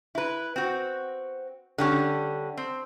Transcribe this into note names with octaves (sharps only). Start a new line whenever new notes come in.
E4 B4
C4 F#4
D3 G3 C#4
C4